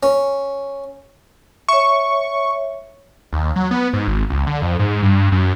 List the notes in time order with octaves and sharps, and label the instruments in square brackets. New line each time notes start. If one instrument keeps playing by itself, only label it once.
[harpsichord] C#4
[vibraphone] C#5 E5 [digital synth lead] C#6
[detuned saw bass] D#2
F#3
B3
G#2
G#1
C#2
D3
F2
G#2
G2
F#2